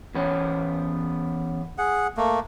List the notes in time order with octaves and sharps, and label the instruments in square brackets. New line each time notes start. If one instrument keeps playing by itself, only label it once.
[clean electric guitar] E2 B3 C#4
[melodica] G#4 F#5
A3 A#3